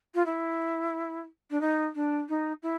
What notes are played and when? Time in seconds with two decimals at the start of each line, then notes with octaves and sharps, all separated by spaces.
0.15 F4
0.26 E4
1.51 D4
1.61 D#4
1.95 D4
2.29 D#4
2.63 E4